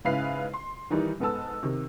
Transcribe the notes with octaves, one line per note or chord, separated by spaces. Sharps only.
G#2 C#3 E4 B4 F5 C7
C6
D#3 E3 G3 D#4
G#2 B3 A4 A5 E6
C3 D#3